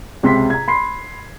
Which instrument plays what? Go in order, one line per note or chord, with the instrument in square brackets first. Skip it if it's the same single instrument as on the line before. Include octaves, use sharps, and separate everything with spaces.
[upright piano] C#2 C3 C6 B6
A#5 G#6
B5 C6 C7